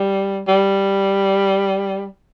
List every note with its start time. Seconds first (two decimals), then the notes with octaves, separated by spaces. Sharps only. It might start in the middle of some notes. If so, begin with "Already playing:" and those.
Already playing: G3
0.48 G3